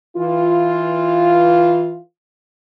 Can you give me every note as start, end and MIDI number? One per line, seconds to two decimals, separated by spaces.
0.17 1.97 52
0.17 1.97 65